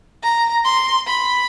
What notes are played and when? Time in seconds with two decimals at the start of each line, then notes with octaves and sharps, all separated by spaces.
0.23 A#5
0.65 C6
1.07 B5